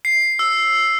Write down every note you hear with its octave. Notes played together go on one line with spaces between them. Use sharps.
C7
E6